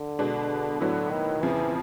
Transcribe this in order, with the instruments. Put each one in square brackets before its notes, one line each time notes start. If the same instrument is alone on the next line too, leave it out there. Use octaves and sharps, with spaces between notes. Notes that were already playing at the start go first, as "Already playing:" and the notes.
Already playing: [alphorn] D3
[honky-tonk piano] B2 G#3 B3 D4
[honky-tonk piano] A2 F#3 B3 E4 [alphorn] D3
[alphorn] D#3
[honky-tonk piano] F2 C#3 F3 [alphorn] E3